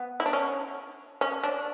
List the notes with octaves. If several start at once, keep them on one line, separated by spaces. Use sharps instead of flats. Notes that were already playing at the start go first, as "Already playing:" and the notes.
Already playing: B3
E4
D4
C#4
C#4
D4